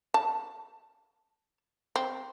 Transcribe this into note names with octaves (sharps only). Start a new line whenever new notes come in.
A5
C4